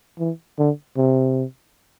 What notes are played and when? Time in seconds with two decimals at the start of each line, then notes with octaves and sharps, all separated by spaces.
0.19 E3
0.58 D3
0.97 C3